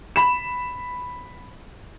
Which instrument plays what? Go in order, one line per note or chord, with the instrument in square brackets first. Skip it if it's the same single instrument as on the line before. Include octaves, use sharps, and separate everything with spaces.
[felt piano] B5 E7